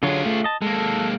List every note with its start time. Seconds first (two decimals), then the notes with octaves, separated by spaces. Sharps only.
0.03 D3 F#3 F4 G#4 C#5
0.26 A3
0.44 D#5 A5
0.62 G#3 A#3 A4